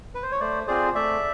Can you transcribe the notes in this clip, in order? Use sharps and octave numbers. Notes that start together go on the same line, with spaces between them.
B4
C5
C#5
A3 C5 D5
C4 F4 G#4 C5 D5
A3 D5 E5